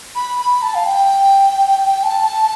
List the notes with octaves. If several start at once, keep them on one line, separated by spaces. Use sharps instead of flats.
B5
B5
A5
F5
G5
A5